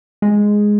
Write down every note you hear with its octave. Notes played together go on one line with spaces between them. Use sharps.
G#3